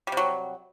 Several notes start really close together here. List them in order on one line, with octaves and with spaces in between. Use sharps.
G3 C3 F#3